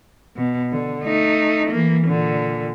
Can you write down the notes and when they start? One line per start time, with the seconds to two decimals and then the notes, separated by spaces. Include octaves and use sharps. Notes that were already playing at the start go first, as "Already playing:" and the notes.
0.37 B2
0.72 D3
1.04 A3 D#4
1.71 E3 A#3
2.07 A#2 D3